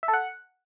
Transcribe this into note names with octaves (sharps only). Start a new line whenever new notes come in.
E5
A4
F#5